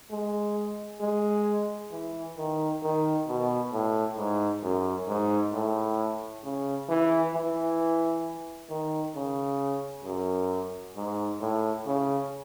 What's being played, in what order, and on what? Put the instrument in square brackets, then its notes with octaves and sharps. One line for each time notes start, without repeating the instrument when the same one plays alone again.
[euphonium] G#3
G#3
E3
D#3
D#3
B2
A2
G#2
F#2
G#2
A2
C#3
E3
E3
D#3
C#3
F#2
G#2
A2
C#3